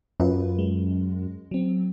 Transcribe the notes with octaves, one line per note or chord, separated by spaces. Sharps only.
F#2 F4 B4
G#3
F#3 C4